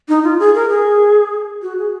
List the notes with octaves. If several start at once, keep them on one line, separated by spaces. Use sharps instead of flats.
D#4
F4
G#4
A#4
G#4
F#4
G#4